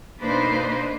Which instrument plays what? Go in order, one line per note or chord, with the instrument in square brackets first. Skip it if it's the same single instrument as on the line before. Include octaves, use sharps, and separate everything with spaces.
[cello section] B2 A#3 D4 D#4 B4 C5